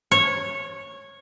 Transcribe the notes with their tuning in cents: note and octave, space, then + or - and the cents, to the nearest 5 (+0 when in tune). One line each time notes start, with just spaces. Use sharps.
C#5 -10